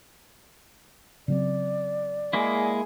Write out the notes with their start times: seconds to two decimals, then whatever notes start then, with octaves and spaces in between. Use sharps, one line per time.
1.28 C#3 F#3 C4 D5
2.33 G#3 A#3 E4 G#4